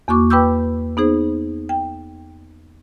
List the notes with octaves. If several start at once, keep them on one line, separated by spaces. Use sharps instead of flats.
E2 A#3 F#4 C#6 D6
B4 G5 B5 D6 E6 G6
B3 D#4 G#4 C5
G5